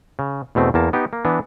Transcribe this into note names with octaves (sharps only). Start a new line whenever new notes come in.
C#3
E2 B2 A3 C4
E2 A#3 A5
B3 D#4 G4
A#3
E3 B3 D4